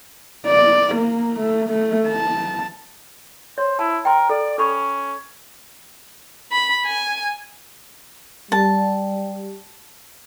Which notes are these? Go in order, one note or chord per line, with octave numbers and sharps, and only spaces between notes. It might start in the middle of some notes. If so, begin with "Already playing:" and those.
D5
A#3
A3
A3
A5
C5 C#5
E4 A5
A#4 G5 C6
A4 D5
C#4 A4 B5 C#6
B5
G#5
G3 A5